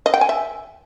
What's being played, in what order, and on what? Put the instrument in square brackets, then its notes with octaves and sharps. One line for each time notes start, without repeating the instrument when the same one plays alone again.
[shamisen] D#5
G5
G#5
E5